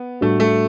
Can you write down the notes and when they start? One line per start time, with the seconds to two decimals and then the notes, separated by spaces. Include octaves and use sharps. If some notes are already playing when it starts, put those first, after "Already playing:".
Already playing: B3
0.21 A2 G3 A3 D4 F#4
0.40 A3